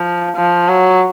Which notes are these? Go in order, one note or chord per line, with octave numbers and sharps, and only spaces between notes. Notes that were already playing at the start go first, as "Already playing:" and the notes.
Already playing: F3
F3
F#3